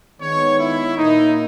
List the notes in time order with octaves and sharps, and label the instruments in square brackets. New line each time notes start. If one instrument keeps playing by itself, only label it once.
[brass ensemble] D#3 G#3 B3 C#5
E4
A#2 A#3 D#4